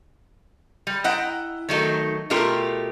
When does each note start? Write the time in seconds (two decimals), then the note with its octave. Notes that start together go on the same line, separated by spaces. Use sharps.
0.87 G3
1.04 E4 D#5 F#5 G5 A#5
1.69 D#3 F#3 A3 D#4
2.30 B2 A3 F4 G4 A#4